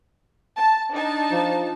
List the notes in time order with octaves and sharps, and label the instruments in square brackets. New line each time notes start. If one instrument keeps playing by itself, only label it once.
[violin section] A5
D4 D#4 A5
[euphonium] F3